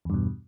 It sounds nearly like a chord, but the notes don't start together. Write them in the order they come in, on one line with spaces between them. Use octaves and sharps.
E2 G2 B2